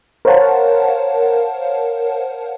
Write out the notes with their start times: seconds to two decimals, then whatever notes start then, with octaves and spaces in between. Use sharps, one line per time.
0.25 A#4 C5 C#5 F5 F#5 A5